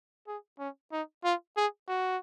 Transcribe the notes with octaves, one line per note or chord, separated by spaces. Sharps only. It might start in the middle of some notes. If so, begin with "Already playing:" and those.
G#4
C#4
D#4
F4
G#4
F#4